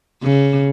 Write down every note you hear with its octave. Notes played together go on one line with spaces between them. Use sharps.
C#3